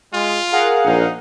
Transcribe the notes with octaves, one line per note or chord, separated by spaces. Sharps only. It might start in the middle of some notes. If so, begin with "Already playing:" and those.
G#3 F4
G#4 A#4 F5 F#5
A#1 D#4